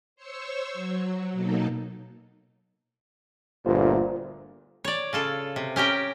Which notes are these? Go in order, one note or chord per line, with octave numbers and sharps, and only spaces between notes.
C5 C#5 C#6 E6
F#3
B2 F#3 A#3 D#4 A4
G1 D2 A#2 F4 C5
C#5 D5
C#3 F4 A4
C3
C#4 G4 A#4 G5